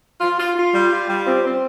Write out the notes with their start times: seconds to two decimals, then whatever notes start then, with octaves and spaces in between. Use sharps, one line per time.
0.21 F4
0.39 F4
0.56 F4
0.74 G3
0.91 F4
1.09 G3
1.27 C4
1.44 C4